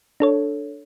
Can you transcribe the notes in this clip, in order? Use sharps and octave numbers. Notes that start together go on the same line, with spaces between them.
D4 A4 C#5